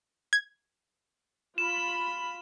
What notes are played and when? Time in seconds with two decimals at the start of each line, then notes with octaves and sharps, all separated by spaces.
0.33 G#6
1.58 F4 B5 E7